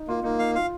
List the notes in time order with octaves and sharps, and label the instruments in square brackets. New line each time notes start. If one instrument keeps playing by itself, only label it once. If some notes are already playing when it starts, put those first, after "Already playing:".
Already playing: [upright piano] D#4
[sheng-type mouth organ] A#3 [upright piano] F4
[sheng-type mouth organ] A#3 [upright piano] D#4
[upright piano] D#4 [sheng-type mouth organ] F5
[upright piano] F4 [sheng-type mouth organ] F5